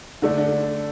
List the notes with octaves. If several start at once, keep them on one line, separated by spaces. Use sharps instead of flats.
D3 A3 D4